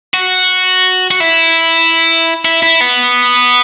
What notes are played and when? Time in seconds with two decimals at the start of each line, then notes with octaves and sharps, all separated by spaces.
0.14 F#4
1.11 F#4
1.20 E4
2.45 E4
2.63 E4
2.81 B3